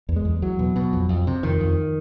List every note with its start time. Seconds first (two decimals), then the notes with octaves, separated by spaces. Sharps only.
0.09 E2
0.16 G#3
0.25 E2
0.42 E2 F#3
0.59 B2
0.76 B2
0.93 F2
1.09 F2
1.27 C3
1.43 F2 D#3
1.61 F2